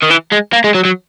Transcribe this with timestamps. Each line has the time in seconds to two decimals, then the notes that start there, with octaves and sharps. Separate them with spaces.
0.03 D#3
0.11 E3
0.32 G#3
0.53 A#3
0.64 G#3
0.75 F#3
0.85 F#3